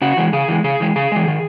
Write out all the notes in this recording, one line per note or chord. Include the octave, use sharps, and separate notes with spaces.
C#3 F#4
E3 G#3
C#3 G#4
E3 G#3
C#3 G#4
E3 G#3
C#3 G#4
E3 G#3
D#3